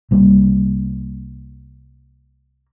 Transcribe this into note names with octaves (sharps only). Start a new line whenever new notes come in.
C2 G3 A#3